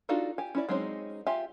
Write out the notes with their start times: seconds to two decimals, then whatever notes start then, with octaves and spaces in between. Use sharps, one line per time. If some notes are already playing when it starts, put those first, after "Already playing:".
0.09 D4 D#4 F4 F#4 A4
0.38 G4 G#5
0.55 C#4 E4 D5
0.69 F#3 G#3 C4 C#4 D#4
1.26 F4 G4 E5 G#5